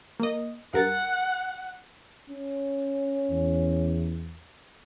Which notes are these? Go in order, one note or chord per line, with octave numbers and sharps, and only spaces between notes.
A#3 D#5
G2 A#4 F#5 A6
C#4
E2